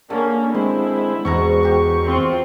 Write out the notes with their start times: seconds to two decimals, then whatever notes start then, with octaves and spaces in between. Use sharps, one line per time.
0.10 D3 A#3 C#4
0.55 G#3 C4 E4 C6
1.25 E2 G#2 B2 A#5 C#6
1.63 F#4 G4
2.06 C4 F4